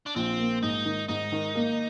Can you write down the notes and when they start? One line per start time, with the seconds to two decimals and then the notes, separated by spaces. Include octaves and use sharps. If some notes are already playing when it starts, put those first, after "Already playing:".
0.06 D4
0.16 A#1 C4
0.39 A#3
0.63 G#2 D#4
0.85 D#3
1.09 G#2 D#4
1.32 D#3
1.55 A#3